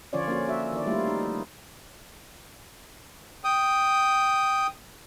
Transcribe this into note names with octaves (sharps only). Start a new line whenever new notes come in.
D3 F3 C#4 F4 C#5 D5
A#3 C#4 F#4
F#4 E5
D#3 D5
G3 A3 A#3 E4 F4
D#4
G5 D#6